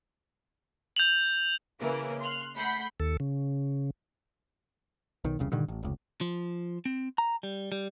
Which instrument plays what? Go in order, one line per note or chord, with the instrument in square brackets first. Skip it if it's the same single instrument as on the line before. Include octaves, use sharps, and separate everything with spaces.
[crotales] G6 F7 F#7
[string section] C#3 E3 A#3
C6 F6 F#6
A3 F#5 B5 G6 B6 C7
[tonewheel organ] D#2 A4
C#3
[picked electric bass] B1 D#3
E1 C2 C#3
G2 A#2 D3 D#3
A1
F1 C#2
[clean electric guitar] F3
C4
A#5
G3
G3